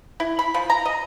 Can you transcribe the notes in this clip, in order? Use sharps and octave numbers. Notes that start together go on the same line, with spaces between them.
E4
B5
F3
A#5
D#5